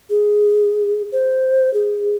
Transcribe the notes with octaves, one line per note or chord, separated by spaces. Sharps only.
G#4
C5
G#4